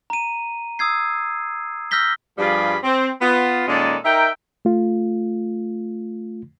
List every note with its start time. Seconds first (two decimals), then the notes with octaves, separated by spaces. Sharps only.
0.10 A#5 D#7
0.79 D#6 E6 G#6 C7
1.91 E6 F6 G6 A#6 B6 G7
2.38 G2 F3 G3 F4 G#4 B5
2.83 C4
3.21 B3 F4
3.68 A#2 D#3 G#3 C#4 A4 D5
4.05 D#4 A#4 E5 G5
4.65 A3 F4